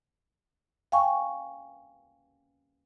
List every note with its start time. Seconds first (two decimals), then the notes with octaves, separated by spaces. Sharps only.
0.92 F5 G5 G#5 C#6